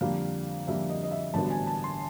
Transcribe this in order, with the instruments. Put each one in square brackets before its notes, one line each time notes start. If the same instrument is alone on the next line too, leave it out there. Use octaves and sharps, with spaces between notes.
[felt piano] F2 D3 G3 A#3 F5
F2 D3 G3 A#3 E5
D#5
D#5
E5
A1 G2 D3 F#3 B3 A5
G#5
A5
C6